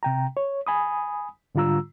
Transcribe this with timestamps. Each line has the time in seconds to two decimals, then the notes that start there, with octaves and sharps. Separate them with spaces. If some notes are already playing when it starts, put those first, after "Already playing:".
0.03 C3 G5 A#5
0.37 C#5
0.67 G#5 B5 D#6
1.55 G#2 D3 G3 F4 A#5 E6